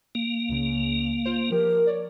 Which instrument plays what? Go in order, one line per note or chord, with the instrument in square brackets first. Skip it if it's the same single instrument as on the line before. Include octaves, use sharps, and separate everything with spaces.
[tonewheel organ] A#3
[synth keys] C#2 C#3
F4 C5
[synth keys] F3 G4 [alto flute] A#4
[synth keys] C#5 D5